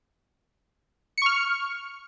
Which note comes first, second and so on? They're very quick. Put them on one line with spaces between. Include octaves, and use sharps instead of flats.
C#7 C#6 F6